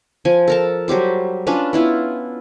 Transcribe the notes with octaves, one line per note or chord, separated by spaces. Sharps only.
F3 G#5
A4 A#4 A5
F#3 G3 G4 C5
C#4 D4 F4 B4
B3 E4 F4